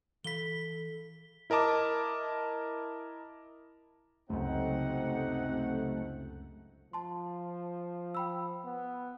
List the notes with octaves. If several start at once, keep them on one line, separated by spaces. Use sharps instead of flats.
E3 A4 F5 B5 B6 G7
E4 A#4 D#5 A5 D6
C#2 F#2 C3 A3 C4 D#4 F#5
F3 A5 C6
G5 B5 E6
B3